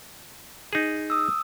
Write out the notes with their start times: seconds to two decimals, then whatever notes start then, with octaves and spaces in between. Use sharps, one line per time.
0.73 D#4 G#4
1.10 D#6 E6